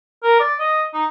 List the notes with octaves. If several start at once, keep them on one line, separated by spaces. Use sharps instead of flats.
A#4
D5
D#5
D#4